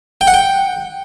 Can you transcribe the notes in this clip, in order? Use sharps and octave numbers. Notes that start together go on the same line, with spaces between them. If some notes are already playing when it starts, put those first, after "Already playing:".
G5
F#5
G5